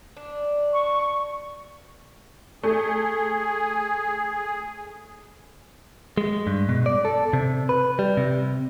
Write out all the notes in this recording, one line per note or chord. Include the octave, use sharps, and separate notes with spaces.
D4
C#6
A3 G#4
G#3
G2
B2
D5
A4
C3
B4
G3
C3